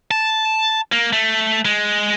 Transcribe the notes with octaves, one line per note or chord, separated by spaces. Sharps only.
A5
A#3
A3
G#3